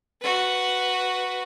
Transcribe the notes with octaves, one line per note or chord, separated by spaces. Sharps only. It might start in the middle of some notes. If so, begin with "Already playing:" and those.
F#4 B4